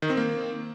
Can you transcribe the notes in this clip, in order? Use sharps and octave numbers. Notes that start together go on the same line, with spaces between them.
D#3
C4
A#3